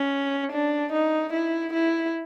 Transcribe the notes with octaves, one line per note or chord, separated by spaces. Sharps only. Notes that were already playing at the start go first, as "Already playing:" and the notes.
Already playing: C#4
D4
D#4
E4
E4